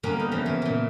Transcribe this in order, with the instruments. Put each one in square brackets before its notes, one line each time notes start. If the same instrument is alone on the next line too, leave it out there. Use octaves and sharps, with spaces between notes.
[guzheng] D3 G3 A#3 B3 C#4
D#4
C#3 E3 F3
E3 C#4
A#2 C#3